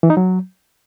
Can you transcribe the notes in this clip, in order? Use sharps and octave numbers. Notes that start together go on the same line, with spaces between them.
E3
D#4
F#3